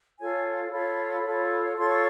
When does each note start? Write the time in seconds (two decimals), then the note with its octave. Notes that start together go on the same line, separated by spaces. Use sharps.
0.19 F4 A4 C#5 G#5
0.72 F4 A4 C#5 B5
1.24 F4 A4 C#5
1.78 F4 A4 C#5 C6
1.92 C#6